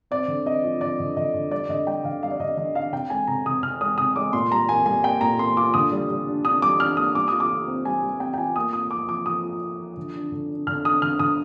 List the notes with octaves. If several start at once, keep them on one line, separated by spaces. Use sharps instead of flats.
C4 D5
D3
C4 D#5
F3
D3 D5
D3
D3 D#5
D3
G3 D5
D3 D#5
G3 G5
D3 F5
G3 F5
D5
D3 D#5
D3 D#5
D4 F5
C3 G5
G#3 G#5
C3 A#5
C3 D#6
C3 F6
G#3 D#6
C3 D#6
G#3 D6
A#2 C6
G3 A#5
A#3 G#5
G3 G#5
A#3 G5
A#2 A#5
A#3 C6
F4 D6
D3 D#6
G3
G3
D4
D4 D#6
G3 D6
D4 F6
A#3 D#6
G3 D6
F4 D#6
D6
F4
C4
G3 G#5
G3
C4 G5
G5
F4 G#5
A#3 D#6
F4 D#6
F3 D6
F3 D6
F3 D#6
F4
F4
F3
D3
D4
D3
D4
D3 F6
D4 D#6
D3 F6
D3 D#6